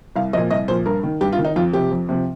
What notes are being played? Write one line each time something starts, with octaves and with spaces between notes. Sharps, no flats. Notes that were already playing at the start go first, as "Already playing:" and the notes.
C2 F5
A#2 F3 D#5
C2 D#5
A#2 F3 C5
G2 A#4
D#3
G2 G4
F4
D#3
D#4
F2 F4
C3 F3 G4
F2
C3 F3